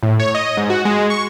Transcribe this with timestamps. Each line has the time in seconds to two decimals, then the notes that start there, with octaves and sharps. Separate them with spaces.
0.03 A2
0.20 C#5
0.35 D#5
0.57 G#2
0.70 F#4
0.85 G#3
1.10 C#6